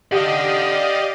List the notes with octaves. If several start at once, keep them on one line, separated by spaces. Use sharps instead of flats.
G4 D5 D#5 F5 F#5